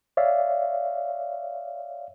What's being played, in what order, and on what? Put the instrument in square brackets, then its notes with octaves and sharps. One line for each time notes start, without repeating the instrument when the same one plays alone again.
[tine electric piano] C#5 D5 E5 F5